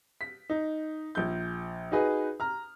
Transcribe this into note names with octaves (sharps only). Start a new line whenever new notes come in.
B6
D#4
A#1 G6
D#4 F#4 G#4 B4
A#5 F6